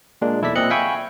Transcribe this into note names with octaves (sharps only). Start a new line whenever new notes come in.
A#2 G#3 A#3 D4
B1 E2 E4 A4 D5 B6
A#2 C4 D#5 F#6 C#7
E5 F5 G5 G#5 B5 C#6